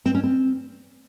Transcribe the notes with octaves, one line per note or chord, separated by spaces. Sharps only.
C4
C#4
C4